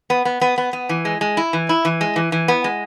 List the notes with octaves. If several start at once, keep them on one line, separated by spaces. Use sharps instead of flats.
B3
B3
B3
B3
B3
E3
G#3
G#3
E4
E3
E4
E3
G#3
E3
E3
B3
G#3